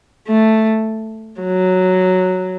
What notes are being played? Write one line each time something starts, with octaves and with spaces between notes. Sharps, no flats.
A3
F#3